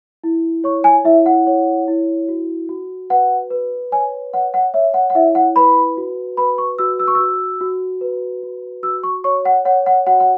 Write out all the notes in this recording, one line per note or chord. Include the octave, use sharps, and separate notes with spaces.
E4
C#5 C#6
G#5
E4 E5
F#5
C#5
E4
F#4
F#4
B4 F#5
B4
C#5 G#5
C#5 F#5
F#5
C#5 E5
F#5
F#5
E4 E5
F#5
B4 B5
F#4
B4 B5
C#6
F#4 E6
E6
C#6
F#4 E6
F#4
B4
F#4
F#4 E6
C#6
C#5 C#6
F#5
C#5 F#5
F#5
F#4 F#5
F#5